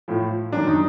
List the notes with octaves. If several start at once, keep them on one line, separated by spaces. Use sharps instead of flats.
A2 F3
F#2 D#3 F#3 D4
D#4